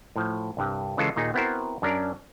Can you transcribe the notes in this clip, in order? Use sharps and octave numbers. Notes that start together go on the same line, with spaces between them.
A2 F3
C2 G2 G4
C#3 E3 G#3 F4 A4
D#2 A#2 D#4 G#4
B3 C4 E4 F#4 A#4 C5
F#2 C#4 D4 A#4 D5